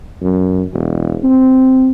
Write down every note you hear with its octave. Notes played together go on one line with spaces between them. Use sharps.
F#2
E1
C4